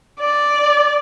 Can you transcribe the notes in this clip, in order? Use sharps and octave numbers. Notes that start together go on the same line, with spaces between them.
D5